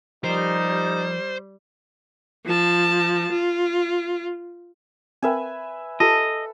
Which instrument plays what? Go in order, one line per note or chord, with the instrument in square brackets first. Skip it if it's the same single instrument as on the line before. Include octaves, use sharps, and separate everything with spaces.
[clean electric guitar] F3 G4 A#4 [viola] G3 [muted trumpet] D#4 [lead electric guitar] C5
[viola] F3 A5
F4
[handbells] C4 A#4 G5 [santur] B4 E5 G#5
[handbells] F4 G4 [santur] A4 [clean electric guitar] D#5